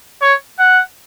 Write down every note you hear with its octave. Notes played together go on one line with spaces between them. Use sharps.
C#5
F#5